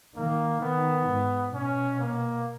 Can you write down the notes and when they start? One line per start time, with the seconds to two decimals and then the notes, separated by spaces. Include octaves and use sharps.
0.16 D#3 A#3
0.61 D#3 B3
1.08 G#2
1.54 B2 C#4
1.99 A#3